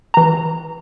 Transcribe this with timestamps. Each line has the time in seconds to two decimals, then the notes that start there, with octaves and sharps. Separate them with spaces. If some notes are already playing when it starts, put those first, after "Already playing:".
0.14 E3 A#5